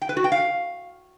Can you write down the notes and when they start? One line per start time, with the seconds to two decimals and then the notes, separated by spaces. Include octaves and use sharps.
0.02 G5
0.09 B4
0.17 F#4
0.24 G5
0.32 F5